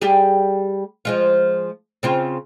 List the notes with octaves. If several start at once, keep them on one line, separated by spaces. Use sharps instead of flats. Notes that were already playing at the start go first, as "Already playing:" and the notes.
G3 G4 G#4
F3 G#3 F4
C#3 C4 F4